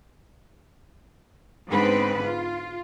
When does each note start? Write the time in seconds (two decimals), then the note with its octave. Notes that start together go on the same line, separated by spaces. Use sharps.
1.68 G#2 D3 B3 C4 B4
2.24 F4